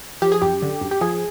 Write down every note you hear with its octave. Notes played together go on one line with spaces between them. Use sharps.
F3 G4
G#4
F#2 G4
D3
F#2
G4
F3 G#4